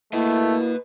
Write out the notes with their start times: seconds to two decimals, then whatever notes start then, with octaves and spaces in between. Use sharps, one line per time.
0.13 A3 A#3 E4 B4 D#5